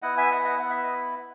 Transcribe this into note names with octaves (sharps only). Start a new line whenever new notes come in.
B3 E4 D#5 F#5
E5 G#5
D#5 F#5
D#5 F#5
B3 E4 F#5
E5
D#5